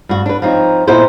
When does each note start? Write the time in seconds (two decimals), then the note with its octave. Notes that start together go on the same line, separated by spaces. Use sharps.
0.09 G2 F#4
0.26 D4 B4
0.42 F3 C4 D#4 C#5
0.87 A#2 B3 D#4 E4 B4 C5